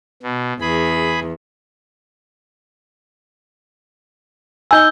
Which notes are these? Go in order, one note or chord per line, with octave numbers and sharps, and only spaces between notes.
B2
E2 G#4 B5
D#4 G#5 E6 G6 G7